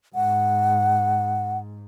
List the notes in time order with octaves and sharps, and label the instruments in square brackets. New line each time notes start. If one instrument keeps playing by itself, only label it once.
[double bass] G#2 [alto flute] F#5